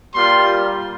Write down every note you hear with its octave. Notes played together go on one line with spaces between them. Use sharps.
G3 A#3 F4 C6